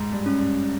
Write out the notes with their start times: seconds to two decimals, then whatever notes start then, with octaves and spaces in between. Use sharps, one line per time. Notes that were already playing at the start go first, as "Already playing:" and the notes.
Already playing: G#2
0.12 G2
0.26 C#4
0.39 G2